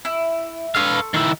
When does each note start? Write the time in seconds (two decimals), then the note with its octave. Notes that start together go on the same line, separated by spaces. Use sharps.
0.05 E4
0.75 A4 B4 F5 C6 C#6
1.14 D#3 E4